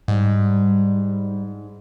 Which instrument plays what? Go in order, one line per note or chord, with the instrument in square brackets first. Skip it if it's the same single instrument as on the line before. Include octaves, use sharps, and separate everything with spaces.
[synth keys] G#2 [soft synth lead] G3